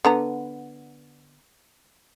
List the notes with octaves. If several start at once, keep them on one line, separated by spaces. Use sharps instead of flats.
D3 B3 A#5